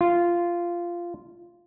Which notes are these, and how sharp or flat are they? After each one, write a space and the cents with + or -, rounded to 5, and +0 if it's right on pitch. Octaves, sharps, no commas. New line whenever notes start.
F4 -10